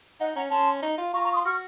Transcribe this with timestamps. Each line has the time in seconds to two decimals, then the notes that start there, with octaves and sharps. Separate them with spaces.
0.20 D#4 D#5 F#5
0.36 C#4 F#5 A#5
0.51 C#4 A5 C6
0.82 D#4
0.98 F4
1.13 F4 A#5 C#6
1.24 A#5 C#6
1.34 C6 D#6
1.45 F#4 C#6 F6